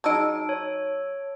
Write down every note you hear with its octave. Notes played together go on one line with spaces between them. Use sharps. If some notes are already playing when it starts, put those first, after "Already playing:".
F#3 D#4 G#4 D#5 A5 E6 D7
C#5